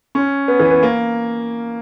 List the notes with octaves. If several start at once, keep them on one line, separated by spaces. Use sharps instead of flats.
C#4
B3
E3
B3
A#3